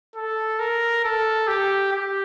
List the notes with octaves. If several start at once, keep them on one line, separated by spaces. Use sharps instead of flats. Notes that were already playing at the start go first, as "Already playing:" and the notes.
A4
A#4
A4
G4
G4